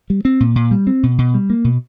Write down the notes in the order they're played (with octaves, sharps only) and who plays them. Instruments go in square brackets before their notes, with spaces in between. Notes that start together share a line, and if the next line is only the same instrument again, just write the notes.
[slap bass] G3
C4
A#2
A#2
G3
C4
B2
B2
G3
A#3
B2